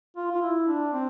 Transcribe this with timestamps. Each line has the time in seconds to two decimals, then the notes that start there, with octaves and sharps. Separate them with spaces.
0.17 F4
0.32 F4
0.42 E4
0.67 D4
0.93 C4